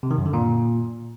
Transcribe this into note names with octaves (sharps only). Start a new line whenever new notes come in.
C3
D#3
F#2
D3
A#2